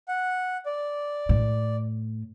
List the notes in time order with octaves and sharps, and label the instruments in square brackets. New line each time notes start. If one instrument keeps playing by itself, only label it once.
[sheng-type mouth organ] F#5
D5
[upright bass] A2